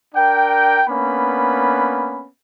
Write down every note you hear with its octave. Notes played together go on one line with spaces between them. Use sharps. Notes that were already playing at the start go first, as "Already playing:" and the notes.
D4 A#4 G5
A#3 B3 C#4 D4 B5